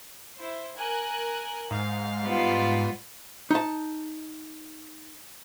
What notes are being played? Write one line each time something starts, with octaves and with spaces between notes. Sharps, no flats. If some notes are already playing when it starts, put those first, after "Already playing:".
E4 C5
A#4 G#5 F#6
G#2 F5
G3 B3 F4
D#4 A5